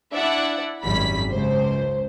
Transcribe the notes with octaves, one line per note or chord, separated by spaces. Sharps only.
D4 E4 D5 E5 F#5
G#1 F#2 G3 B5 B6
C#2 C5